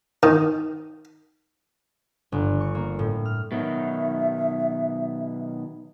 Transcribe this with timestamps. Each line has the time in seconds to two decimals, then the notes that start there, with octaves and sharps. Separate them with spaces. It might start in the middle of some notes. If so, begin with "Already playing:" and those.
0.23 D#3
2.32 G1
2.60 C#6
2.75 A#3
2.99 A2
3.25 F6
3.52 B2 D#3 F#3 E5